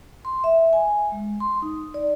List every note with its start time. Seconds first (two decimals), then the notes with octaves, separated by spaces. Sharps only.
0.25 C6
0.44 E5
0.73 G#5
1.12 G#3
1.40 C6
1.62 D#4
1.94 D5